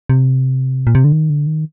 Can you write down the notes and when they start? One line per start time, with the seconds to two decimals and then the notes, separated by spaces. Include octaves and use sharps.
0.09 C3
0.87 A#2
0.95 C3
1.04 D3
1.12 D#3
1.30 D3
1.47 D#3